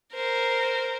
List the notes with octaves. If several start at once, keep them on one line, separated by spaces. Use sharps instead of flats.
A#4 C5